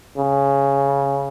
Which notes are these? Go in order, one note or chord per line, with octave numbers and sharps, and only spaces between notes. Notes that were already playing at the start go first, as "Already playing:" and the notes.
C#3